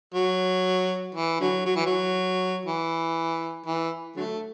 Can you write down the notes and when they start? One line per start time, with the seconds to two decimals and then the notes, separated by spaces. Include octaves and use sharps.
0.15 F#3
1.15 E3
1.40 D3 F#3
1.66 F#3
1.76 E3
1.86 F#3
2.65 E3
3.66 E3
4.16 D3 F#3 A3